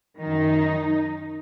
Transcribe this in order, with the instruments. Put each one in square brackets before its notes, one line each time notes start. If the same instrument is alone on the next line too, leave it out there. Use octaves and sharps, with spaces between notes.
[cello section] F#2 D#3 D#4